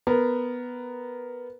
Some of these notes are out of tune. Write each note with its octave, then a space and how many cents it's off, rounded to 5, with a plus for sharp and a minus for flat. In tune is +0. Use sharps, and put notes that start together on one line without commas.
B3 +0 A#4 +0